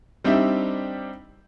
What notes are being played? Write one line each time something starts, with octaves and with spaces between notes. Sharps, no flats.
G3 C4 D4 D#4 G4 E5